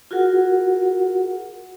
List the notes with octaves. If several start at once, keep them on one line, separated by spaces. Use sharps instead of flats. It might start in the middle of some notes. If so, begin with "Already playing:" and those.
F4 F#4 G#4 A#4 F#5